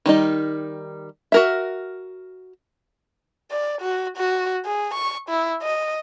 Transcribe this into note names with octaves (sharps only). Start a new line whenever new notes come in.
D#3 G3 D#4
F#4 A#4 E5
D5
F#4
F#4
G#4
C#6
E4
D#5